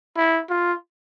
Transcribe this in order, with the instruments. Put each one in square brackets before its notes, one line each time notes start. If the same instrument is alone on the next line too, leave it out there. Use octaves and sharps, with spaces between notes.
[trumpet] E4
F4